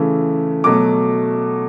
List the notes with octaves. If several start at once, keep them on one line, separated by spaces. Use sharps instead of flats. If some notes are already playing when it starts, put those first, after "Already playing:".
Already playing: C#3 E3 A3
B2 F#3 A3 D6